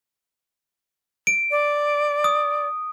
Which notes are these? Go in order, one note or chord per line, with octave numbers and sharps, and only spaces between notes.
D7
D5
D#6